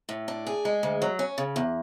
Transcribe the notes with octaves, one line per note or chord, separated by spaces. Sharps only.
A2
D4
G#4
G#3
D2
F#3
C#4
C#3
E2